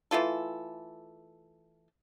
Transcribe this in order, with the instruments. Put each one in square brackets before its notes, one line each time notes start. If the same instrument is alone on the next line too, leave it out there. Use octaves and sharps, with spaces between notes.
[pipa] E3 A3 F4 A4